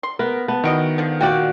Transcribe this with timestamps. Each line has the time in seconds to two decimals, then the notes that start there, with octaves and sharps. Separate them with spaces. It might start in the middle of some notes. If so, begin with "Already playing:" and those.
0.03 C6
0.19 B3 A#4
0.48 B3 A5
0.64 D#3 E4 F#4 D#5 D7
0.98 D3 F3
1.21 A#2 F#4 D5 G5